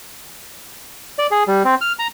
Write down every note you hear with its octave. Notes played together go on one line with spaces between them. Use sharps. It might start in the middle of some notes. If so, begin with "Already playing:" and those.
D5
G#4
G3
C4
F6
A#5